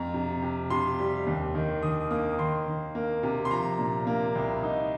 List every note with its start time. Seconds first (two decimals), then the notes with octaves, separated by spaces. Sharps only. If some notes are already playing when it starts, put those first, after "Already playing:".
Already playing: F2 A#5
0.14 C3
0.42 C3
0.70 C3 C6
0.99 G3
1.26 D#2
1.55 D#3
1.82 D#3 D#6
2.11 A#3 D#6
2.39 D#3 C6
2.67 D#3
2.95 A#3
3.23 C3
3.45 C6
3.51 F3 A#5
3.79 A#2
4.07 A#3
4.35 C2
4.63 D#4